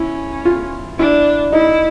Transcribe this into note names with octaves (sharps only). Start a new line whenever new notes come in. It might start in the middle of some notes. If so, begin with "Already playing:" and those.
Already playing: C#4 E4
F4
D4 E4
D#4 E4